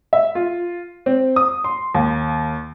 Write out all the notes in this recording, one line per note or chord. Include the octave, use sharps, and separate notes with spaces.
E5
F4
C4
D#6
C6
D#2